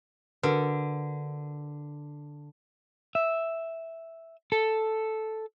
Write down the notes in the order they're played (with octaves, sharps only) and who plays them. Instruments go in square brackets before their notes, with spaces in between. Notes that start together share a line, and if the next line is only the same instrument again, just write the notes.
[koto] D3 [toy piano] F#4 A#4 B4
[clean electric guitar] E5
A4